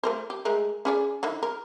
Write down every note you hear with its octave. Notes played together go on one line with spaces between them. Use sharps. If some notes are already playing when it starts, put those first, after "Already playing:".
A3 A#4 C5
G4
G#3 A3 A#4
C#4 G#4 D5
D3 D#3 E4
A#4